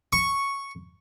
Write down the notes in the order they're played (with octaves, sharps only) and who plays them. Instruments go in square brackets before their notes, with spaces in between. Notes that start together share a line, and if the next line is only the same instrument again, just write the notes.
[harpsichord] C#6